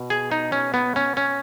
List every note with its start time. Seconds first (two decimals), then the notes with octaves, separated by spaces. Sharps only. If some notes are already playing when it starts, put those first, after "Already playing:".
Already playing: B2
0.10 G#4
0.32 D#4
0.52 C#4
0.74 B3
0.96 C#4
1.17 C#4